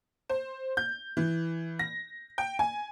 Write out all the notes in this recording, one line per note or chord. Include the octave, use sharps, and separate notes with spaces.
C5
G6
E3
A#6
G5
G#5